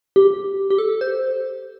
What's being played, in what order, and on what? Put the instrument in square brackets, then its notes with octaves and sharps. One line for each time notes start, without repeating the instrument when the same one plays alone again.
[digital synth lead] G4
G4
A4
C5